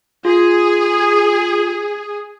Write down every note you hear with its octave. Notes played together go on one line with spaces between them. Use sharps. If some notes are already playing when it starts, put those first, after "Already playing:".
F4 G#4